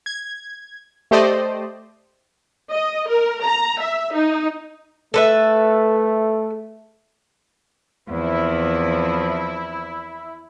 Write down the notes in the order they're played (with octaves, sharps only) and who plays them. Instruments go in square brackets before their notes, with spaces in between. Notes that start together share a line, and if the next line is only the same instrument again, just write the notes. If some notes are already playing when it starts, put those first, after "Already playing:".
[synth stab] G#6
A3 G4 C5 D5 D#5
[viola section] D#5
A#4
A#5
E5
D#4
[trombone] A3 [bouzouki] A4 B4 E5
[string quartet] E2 F3 C4 [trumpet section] E4